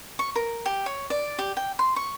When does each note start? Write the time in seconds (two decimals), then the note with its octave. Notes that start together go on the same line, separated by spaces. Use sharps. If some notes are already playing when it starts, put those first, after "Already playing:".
0.19 C#6
0.36 A#4
0.66 G4
0.86 C#5
1.10 D5
1.39 G4
1.57 G5
1.79 C6
1.96 C#6